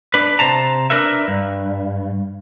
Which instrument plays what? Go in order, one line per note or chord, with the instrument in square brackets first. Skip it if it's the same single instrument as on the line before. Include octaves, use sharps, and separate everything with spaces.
[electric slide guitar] D4 B4
C3 D#3 C5 A5 A#5
D4 A#4 B4 E5
G2